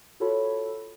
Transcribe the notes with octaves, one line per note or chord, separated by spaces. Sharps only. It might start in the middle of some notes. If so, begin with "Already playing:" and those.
F4 F#4 A4 C#5 B5